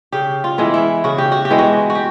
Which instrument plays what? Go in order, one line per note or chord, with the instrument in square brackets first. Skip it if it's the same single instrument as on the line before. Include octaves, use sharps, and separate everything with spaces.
[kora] C#3 G4
F4
E3 G#3 B3
E4
C#3 F#4
G4
F#4
G4
E3 G#3 B3
F#4
F#4
G4